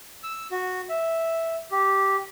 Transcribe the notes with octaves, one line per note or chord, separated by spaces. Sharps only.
E6
F#4
E5
G4